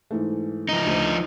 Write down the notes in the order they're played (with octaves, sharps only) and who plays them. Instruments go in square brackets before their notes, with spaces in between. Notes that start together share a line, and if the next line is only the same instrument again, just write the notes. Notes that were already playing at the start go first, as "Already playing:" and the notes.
[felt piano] G#2 E3 A3
[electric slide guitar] F3 D#4
[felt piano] D2 D4